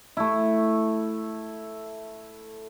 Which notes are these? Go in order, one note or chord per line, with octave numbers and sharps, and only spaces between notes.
A3 E4